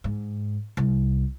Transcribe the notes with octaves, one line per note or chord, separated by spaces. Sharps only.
G#2
C2